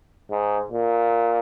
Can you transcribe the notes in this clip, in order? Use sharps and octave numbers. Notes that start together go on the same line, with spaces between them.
G#2
A#2